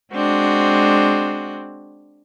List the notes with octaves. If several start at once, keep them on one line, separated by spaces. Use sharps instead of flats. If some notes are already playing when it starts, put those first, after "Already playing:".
G#3 C4 D4 F#4